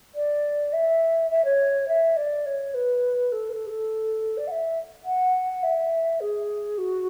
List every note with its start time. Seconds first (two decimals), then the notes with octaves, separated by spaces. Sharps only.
0.15 D5
0.72 E5
1.30 E5
1.44 C#5
1.88 E5
2.16 D5
2.45 C#5
2.74 B4
3.32 A4
3.49 B4
3.52 A4
3.66 G#4
3.69 A4
4.37 D5
4.47 F#5
4.51 E5
5.04 F#5
5.63 E5
6.20 G#4
6.78 F#4